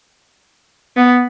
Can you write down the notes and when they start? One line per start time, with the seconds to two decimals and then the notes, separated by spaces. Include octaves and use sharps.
0.97 B3